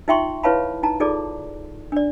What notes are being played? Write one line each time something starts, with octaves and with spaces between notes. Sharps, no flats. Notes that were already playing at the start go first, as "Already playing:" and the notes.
D#4 F4 E5 G5 C6 C#6
E4 B4 C#5 F5 A5 B5
D#4 A5 A#5
D#4 F4 G#4 A4 D5
D4 D5